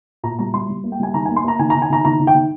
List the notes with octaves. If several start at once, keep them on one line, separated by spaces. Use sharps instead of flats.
A#2 A#5
G3 A#5
G3 C6
G3
A#3
G5
G3 G#5
D#3 A#5
G#5
A#3
C6
A#3 A#5
D#3 G#5
A#5
D#3
G#5
D#3 A#5
D#3 A#5
D#3
G5
D#3